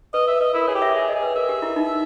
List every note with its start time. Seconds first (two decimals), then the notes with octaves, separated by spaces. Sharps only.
0.14 B4 D#5
0.28 E5
0.41 B4 D#5
0.54 E4 A#4
0.68 G#4 C#5
0.75 G4
0.82 E5
0.95 G#4 E5
1.09 D#5
1.15 G#4
1.22 B4
1.35 A#4 E5
1.49 G4
1.62 E4
1.76 D#4